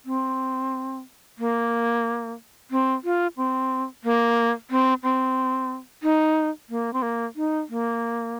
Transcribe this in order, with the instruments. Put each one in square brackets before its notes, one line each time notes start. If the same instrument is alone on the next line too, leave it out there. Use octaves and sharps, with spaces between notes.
[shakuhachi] C4
A#3
C4
F4
C4
A#3
C4
C4
D#4
A#3
C4
A#3
D#4
A#3